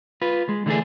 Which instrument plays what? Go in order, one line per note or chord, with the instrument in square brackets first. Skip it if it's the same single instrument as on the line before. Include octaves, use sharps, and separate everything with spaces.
[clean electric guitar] F4 B4
G#3
D3 E3 A3 C#4 D4 G#4